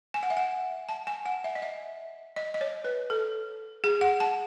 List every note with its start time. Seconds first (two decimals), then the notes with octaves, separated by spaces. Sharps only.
0.14 G#5
0.23 F#5
0.30 E5
0.37 F#5
0.89 A5
1.07 G#5
1.26 F#5
1.44 E5
1.55 D#5
1.62 E5
2.36 D#5
2.54 D#5
2.61 C#5
2.84 B4
3.10 A4
3.84 G#4
4.01 F#5
4.20 A5